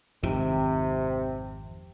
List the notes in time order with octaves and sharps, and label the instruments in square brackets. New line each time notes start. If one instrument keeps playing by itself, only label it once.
[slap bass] G#1 F2 D#3 [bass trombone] C3